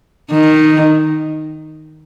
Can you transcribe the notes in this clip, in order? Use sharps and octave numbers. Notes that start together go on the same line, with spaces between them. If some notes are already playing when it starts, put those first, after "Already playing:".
D#3